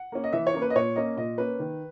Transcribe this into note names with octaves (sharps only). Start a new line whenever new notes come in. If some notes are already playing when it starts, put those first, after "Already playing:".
Already playing: F#5
A#3 C#4
D#5
E3 E5
C#5
A#3 C#4
B4
D#5
A#2 C#5
A#3 C#4 D#5
A#2 D#5
A#3 C#4 B4
D#3